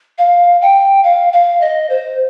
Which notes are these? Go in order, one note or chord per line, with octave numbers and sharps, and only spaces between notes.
F5
G5
F5
F5
D#5
C5